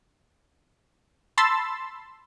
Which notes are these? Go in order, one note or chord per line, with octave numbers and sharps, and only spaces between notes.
A5 B5 C6 E6 A6